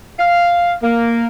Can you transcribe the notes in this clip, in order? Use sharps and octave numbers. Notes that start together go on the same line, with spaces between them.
F5
A#3